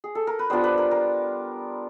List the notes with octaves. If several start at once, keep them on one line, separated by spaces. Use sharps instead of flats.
G#4
A4
A#4
B4
G3 B3 D4 F4 C5
B4
A#4
A#4